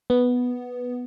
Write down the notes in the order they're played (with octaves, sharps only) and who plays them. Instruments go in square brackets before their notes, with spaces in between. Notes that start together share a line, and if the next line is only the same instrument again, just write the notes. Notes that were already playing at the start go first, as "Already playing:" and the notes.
[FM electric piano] B3